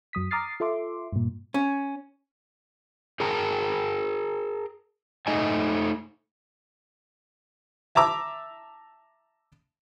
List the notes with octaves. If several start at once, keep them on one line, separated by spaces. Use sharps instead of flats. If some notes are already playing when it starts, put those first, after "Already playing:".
F#2 F#3 D#6 B6
A#5 D6 D#6 F6 A6 C7
F4 A4 E5 C6 D6
G2 A#2
C#4
G#4 A#4 G5 A5 A#5
A3 D#4 D#5 G#5
E5 A5 A#5 D6 E6